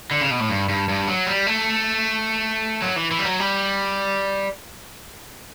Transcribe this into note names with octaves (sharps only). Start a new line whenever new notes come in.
D3
C#3
B2
A2
G2
G2
G2
F#3
G3
A3
F#3
E3
E3
G3
F#3
G3